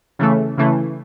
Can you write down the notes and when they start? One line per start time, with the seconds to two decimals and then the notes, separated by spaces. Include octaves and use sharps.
0.19 C#3 E3 A3
0.57 C#3 E3 A3